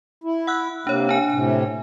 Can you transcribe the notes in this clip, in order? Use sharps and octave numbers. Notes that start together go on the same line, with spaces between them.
E4
F#5 E6 F#6
C3 A#3 D4 C#5
D4 G#5
A2 C3